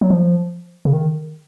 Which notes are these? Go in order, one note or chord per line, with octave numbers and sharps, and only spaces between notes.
F#3
F3
C#3
D#3